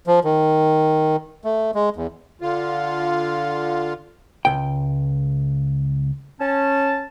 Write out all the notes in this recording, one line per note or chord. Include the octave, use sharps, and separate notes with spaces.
F3
D#3
A3
G#3
E2
D3 F4
C#2 G5
C#4 A5